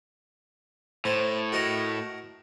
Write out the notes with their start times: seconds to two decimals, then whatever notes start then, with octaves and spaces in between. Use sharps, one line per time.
1.05 A2 C5
1.52 F#4 A#4 D#5